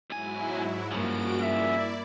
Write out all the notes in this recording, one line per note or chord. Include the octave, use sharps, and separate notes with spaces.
B1 G#2 F#3 E4 G#5
G2 C#3 F3 A#3 F#4 D7
E4 D5 E5